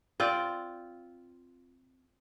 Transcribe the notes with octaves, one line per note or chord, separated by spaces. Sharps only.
C4 F4 D5